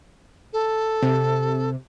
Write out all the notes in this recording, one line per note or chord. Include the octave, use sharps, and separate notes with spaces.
A4
C3